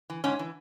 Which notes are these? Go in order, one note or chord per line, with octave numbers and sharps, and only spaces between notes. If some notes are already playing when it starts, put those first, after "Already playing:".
E3
G#2 C#4
E3